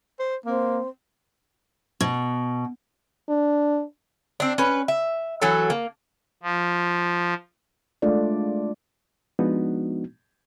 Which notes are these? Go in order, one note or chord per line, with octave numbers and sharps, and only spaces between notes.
C5
A#3 C4
B2
D4
C4 D4
C#4 B4
E5
E3 F#3 F#4 A4
A#3
F3
G#3 A3 D4 F4 D5
F3 G#3 B3 D4 D#4 F#4